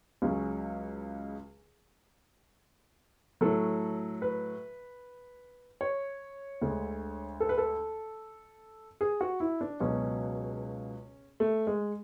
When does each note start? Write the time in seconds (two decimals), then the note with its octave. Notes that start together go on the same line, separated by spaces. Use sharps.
0.22 C#2 C#3 F#3
3.41 A2 F#3 A4
4.22 B4
5.81 C#5
6.62 D2 D3 G#3
7.40 A4
7.49 B4
7.58 A4
9.01 G#4
9.21 F#4
9.40 E4
9.61 D4
9.80 C#2 B2 F#3 C#4
11.40 A3
11.67 G#3